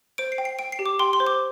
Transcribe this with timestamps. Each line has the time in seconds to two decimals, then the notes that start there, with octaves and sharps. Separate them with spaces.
0.18 C5 D7
0.32 C7
0.38 G5
0.45 C7
0.59 G5 D7
0.72 C7
0.79 G4
0.86 D6
0.99 G5 C6
1.13 C6
1.20 C5
1.27 D6